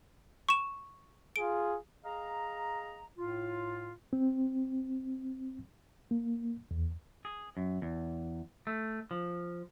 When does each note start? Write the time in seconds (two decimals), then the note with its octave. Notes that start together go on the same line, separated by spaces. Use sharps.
0.49 C#6 E7
1.36 F4 G#4 D7
2.05 G#4 D#5 F5 A#5
3.17 A2 F4
4.13 C4
6.11 A#3
6.71 E2
7.25 G#4
7.57 F#2
7.82 E2
8.67 A3
9.11 F3